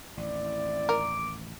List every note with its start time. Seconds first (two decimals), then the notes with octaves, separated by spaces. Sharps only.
0.17 A1 D#2 C4 E4 D5
0.89 A#4 D6